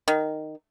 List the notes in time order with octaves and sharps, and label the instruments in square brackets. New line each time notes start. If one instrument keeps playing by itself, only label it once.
[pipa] D#3